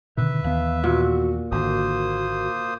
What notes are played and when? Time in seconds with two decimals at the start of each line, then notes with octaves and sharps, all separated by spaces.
0.17 B2 D3 D#3 B4 E5
0.44 D#2 E3 B3 F5
0.84 A#2 F#4
1.51 G#1 D3 A#3 F#4 C5 D#6